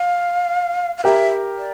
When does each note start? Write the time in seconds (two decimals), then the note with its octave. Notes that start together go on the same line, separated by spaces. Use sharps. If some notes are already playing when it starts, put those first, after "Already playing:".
Already playing: F5
0.98 F5
1.04 G4 A#4 E5
1.57 D5